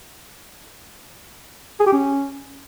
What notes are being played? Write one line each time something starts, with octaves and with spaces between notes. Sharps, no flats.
G#4
G4
C#4